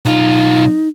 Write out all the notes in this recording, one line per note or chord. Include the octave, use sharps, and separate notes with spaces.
B1 D#4 F4